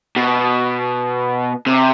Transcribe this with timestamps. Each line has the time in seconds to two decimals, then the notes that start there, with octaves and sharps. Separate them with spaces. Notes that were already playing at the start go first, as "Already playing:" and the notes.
0.16 B2
1.67 C3